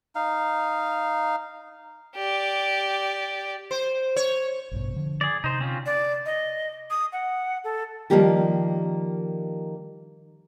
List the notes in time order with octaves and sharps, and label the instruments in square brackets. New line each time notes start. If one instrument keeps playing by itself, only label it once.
[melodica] D#4 F5
[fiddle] G4 D5
[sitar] C5
C#5
[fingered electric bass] A1 G2 B2
D3 F3
[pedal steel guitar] G#4 D5
[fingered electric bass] C3 [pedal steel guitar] D#4 C5
[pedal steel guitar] C4 C#4 F4
[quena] D5
D#5
D#6
F#5
A4
[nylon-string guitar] D#3 F3 G3 A#3 G4 A#4